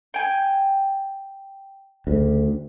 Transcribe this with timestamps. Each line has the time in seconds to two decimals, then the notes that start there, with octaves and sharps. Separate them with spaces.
0.14 G5 G#5
2.07 D2 C#3